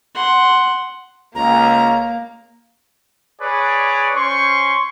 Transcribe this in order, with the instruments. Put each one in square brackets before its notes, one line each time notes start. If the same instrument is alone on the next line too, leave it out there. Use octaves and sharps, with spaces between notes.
[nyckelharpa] F#5 C6
[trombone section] C#2 [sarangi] A#3 [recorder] A#5
[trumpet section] G#4 B4 C#5 D5
C#4 C5 C6 C#6